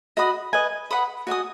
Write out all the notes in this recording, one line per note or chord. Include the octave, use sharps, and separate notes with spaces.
F#4 D#5 B5 D#6
B4 D#5 G#5
B4 F#5 B5 D#6
F#4 D#5 G#5 D#6